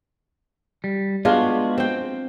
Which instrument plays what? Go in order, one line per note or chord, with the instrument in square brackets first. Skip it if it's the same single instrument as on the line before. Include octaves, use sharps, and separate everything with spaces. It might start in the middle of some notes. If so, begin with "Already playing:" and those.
[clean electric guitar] G3
[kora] G#3 D4 F4 [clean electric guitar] B3 F#4
[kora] C4 G5